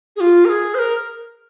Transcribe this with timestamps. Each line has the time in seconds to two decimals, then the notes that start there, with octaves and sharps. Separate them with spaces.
0.16 G#4
0.20 F4
0.45 A#4
0.49 G#4
0.75 C5
0.79 A#4